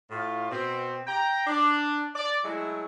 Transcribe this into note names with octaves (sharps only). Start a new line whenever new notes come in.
A2 F4
B2 C4
G5 A#5
D4
D5
F#3 G#3 A3 E4